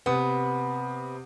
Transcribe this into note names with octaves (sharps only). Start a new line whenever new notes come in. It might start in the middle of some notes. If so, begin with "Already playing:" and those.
C3 B3 D#6